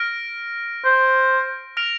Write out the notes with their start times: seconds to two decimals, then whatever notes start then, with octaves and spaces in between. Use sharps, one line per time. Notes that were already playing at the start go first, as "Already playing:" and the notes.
Already playing: F6 A#6 D7
0.85 C5
1.77 F6 A#6 D7 F7